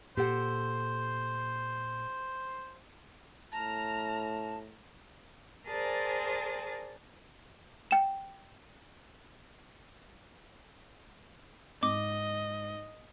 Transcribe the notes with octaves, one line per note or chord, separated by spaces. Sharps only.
A#2 G4 A4 C5 F#5
A2 A5 A#5 F6
G#4 A#4 C5 D5 G#5 A5
G5 E7
G#2 D#5 D6